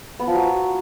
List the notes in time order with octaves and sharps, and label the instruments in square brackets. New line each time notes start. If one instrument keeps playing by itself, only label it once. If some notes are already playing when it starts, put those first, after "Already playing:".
[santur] B3
F3
F#3